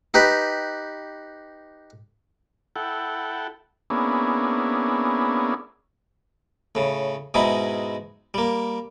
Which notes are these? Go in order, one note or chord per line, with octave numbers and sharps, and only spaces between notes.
D#4 G4 B4
E4 A4 F#5 G5
A#3 B3 C#4 D4 E4 G#4
A2 C#3
G#2 B2 G#3 D#4 E4
G3 A#3